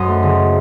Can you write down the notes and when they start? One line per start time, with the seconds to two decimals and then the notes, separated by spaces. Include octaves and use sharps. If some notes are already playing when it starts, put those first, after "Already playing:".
Already playing: F#2 C5 D#5
0.08 A3
0.23 C#3